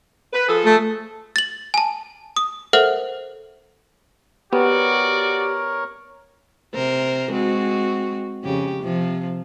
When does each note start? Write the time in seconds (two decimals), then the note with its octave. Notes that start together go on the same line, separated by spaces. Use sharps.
0.33 B4
0.48 F3 G#4 A4
0.65 A3
1.36 A6 F#7
1.74 G#5 A5
2.36 D#6
2.73 A4 A#4 C5 E5 F#5 F6
4.53 B3 F#4 G4 A#4 C#5 D5
6.74 C3 A#4 C5
7.31 G#3 C4 F#4
8.43 F2 C#3 G4
8.81 C3 F3